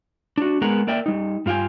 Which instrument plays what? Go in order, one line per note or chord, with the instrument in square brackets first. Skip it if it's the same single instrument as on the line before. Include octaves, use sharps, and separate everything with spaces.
[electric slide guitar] D4 F#4
G#3 B3 G#4 A#4 F#5 A#5
A#3 A#4 D5 E5 G5
G3 D#4
G2 F4 F5 G5 G#5